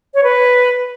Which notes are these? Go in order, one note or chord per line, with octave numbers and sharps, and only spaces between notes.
C#5
B4